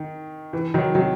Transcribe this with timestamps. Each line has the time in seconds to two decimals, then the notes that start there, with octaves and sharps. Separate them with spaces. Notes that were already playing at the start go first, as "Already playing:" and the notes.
Already playing: D#3
0.53 E3
0.74 D#3 F#3
0.95 D#3 F#3